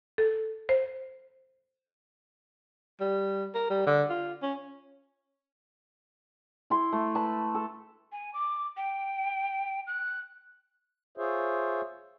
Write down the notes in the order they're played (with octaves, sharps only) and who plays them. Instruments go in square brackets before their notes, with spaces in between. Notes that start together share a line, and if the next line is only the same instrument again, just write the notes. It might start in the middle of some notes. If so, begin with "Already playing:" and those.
[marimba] A4
C5
[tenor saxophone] G3
A#4
G3
D3
F4
C#4
[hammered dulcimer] E4 C6
A3
B4 A5 B5
A4
[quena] G#5
D6
G5
F#6
[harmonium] F4 G#4 C5 C#5 E5